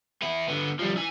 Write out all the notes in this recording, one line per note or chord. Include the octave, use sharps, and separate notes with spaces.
B3 E4
D3 B3
F3 G3
E4 G#5